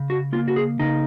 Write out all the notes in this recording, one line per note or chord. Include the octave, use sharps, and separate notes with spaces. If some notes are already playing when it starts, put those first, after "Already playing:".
Already playing: C#3
F#4
A#3 F4
F#4
G#4
C#3 D#4